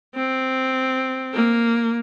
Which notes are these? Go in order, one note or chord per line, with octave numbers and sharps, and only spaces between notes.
C4
A#3